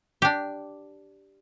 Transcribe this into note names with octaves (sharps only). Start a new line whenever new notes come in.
D4 G4